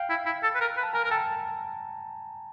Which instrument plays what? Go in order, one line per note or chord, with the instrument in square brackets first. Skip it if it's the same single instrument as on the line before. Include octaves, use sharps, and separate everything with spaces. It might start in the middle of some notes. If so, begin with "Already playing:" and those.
Already playing: [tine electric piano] F5 G5
[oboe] E4
E4
A4
B4
A#4
B4
[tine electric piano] A5
[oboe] A#4 [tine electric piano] G#5 A#5
[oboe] A#4
[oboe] A4 [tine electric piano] G5 A5